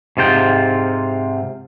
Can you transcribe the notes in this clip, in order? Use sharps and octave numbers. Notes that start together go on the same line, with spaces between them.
G#2 C3 F4 A4 G5